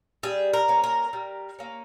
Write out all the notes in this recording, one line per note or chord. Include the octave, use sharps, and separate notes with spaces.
G3 G#4
A#4
A#3 C#4
A#4
G3
A#3 C#4